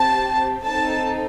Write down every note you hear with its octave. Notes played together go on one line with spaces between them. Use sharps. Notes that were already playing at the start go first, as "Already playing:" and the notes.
Already playing: C4 G4 A5
C4 D#4 A4 A5